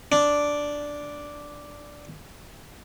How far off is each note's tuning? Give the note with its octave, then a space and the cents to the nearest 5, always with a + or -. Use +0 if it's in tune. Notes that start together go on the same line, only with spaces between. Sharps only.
D4 -5